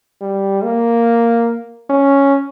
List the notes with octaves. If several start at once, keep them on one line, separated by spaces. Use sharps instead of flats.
G3
A#3
C#4